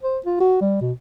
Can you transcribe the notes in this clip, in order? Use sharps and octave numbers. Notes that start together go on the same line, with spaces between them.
C5
F4
F#4
G3
B2